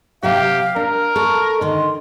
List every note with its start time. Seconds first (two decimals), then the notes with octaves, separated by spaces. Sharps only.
0.23 C3 F#3 G4 E5 F5
0.76 D4 A#4
1.16 A4 C#6
1.61 D3 D#3 C6